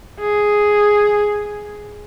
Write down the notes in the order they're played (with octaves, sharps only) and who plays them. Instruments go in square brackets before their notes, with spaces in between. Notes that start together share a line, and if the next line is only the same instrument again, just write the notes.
[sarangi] G#4